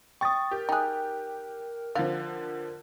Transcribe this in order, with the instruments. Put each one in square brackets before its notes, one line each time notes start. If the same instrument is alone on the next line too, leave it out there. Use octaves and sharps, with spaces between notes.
[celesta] G5 D#6 [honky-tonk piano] C#6 A6
[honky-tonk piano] G4 [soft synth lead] A#4
[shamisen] D#4 G#4 [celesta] G5 F#6
[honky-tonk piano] D3 F3 [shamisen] A#3 D5 F5 [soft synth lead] A#4